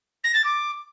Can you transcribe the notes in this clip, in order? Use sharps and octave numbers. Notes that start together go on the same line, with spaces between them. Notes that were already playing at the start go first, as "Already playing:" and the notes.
A#6
A6
D6